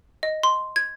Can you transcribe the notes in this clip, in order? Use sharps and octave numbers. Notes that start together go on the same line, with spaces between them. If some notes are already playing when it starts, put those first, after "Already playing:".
D#5
C6
G#6